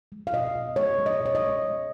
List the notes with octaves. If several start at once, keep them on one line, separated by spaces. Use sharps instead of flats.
G#3
F5
B2 D#5
B2
G#3 C#5
G#3
D#5
B2
C#5
D#5
G#3
G#3